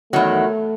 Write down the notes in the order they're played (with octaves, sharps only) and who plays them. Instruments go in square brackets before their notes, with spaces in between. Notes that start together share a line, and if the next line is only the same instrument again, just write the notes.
[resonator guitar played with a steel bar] E2 D#3 F#3 [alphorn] A3